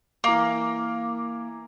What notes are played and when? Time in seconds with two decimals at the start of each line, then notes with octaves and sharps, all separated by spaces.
0.24 E3 A#3 A#5 D6